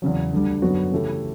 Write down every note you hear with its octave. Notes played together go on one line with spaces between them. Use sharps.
E2 C#3 F#3
D2 D3 G3
F#2 D3 F#3 B3 F#4
C#3 E3 A3 E4 G4